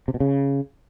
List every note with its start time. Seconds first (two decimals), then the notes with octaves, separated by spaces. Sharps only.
0.08 C3
0.14 B2
0.20 C#3